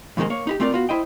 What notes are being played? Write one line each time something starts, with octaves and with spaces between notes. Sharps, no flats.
F2 G#2 D#3 E3 G#3 A#3
A#3 C#5
D#4 E4 G4
A3 C4 F4 A#4 D5
B3 F4 F#4
E4 C5 D#5 G5